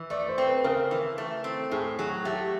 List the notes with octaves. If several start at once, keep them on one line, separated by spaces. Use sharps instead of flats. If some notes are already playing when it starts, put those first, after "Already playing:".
Already playing: E3
A3 D5
C5
C4
B4
C#3 A#4
E3
A3
C4
A2 G#4
F#3 G#4
A3 G4